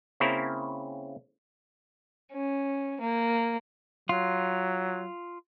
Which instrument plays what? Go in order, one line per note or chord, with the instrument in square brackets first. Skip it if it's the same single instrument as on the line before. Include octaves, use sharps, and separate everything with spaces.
[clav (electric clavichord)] C#3 A#3 C4 C#4 E4 A#4
[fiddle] C#4
A#3
[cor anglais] F#3 [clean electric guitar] F4